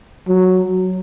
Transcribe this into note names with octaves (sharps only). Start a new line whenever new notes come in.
F#3